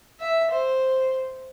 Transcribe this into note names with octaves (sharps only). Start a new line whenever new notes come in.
E5
C5